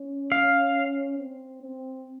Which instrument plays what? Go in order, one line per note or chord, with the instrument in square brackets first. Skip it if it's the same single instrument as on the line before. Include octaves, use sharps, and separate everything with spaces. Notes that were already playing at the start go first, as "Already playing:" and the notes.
Already playing: [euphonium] C#4
[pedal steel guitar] F5
[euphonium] C4
C4